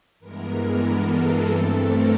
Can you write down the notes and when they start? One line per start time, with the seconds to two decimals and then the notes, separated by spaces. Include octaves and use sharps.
0.20 G2 E3 G#3 B3 A#4
0.82 A4
1.13 G#4
1.43 G2 E3 A3 C4 A4
1.74 A#4